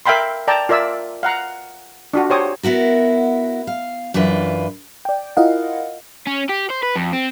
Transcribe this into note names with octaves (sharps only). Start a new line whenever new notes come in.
A#4 E5 F5 G5 B5 C6
D5 G5 A5 A#5
F4 A#4 D5 E5 E6
F5 F#5 A#5
D4 F4 F#4
G4 C5 C#5 D#6
B3 E4 F#4 A#4
F5
F#2 E3 D4 F4 B4
D5 G5
E4 F4 A#4 D#5 F5 F#5
C#4
G4
C5
B4
F2
C4